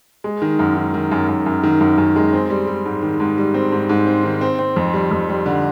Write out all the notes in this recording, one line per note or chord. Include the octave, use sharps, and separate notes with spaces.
G#3
D#3
F#2
D#3
D#3
F#2
F#2
F#2
D#3
F#2
F#2
G#3
C4
G3
G3
G#2
D#3
G#2
G3
C4
G#2
G#2
C4
D#3
C4
C4
F2
G3
F2
G3
D3